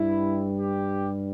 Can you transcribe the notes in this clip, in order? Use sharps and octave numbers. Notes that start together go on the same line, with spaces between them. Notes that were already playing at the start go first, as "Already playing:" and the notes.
Already playing: G2 G3 E4
G4